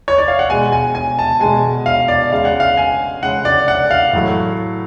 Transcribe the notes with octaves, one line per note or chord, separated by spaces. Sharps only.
C#5
D5
F5
F#5
B2 G#3 G#5
G#5
G#5
A5
B2 G#3 G#5
F5
D5
C#3 G#3 F5
F#5
F5
G#5
C#3 G#3 F#5
D5
F#5
F5
A2 F#3 A3